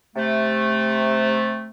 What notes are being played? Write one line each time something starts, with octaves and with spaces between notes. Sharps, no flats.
C3 A3